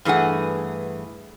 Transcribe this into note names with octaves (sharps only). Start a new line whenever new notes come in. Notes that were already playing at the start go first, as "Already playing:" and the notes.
G2 E3 A3 G#4 F#5